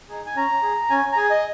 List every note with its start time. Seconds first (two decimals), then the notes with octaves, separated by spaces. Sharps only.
0.09 D#4 G#4
0.26 G#5
0.36 C#4 A#5
0.63 G#4
0.90 C#4 G#5
1.12 A#5
1.17 G#4 G#5
1.30 D#5